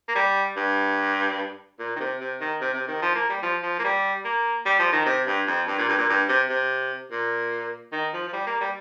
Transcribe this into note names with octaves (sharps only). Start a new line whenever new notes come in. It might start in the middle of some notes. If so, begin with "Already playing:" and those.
A#3
G3
G2
A#2
D#3
C3
C3
D#3
C3
C3
D#3
F3
A#3
G3
F3
F3
A#3
G3
A#3
G3
F3
D#3
C3
G2
F2
G2
A#2
G2
A#2
G2
C3
C3
A#2
D#3
F3
F3
G3
A#3
G3